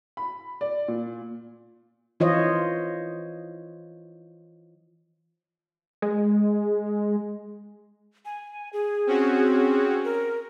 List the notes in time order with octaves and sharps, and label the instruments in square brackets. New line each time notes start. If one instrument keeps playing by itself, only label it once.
[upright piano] B5
D5
A#2
[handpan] E3 F4 C5 C#5 D#5
[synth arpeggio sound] G#3
[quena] G#5
G#4
[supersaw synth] C4 C#4 F#4
[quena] A#4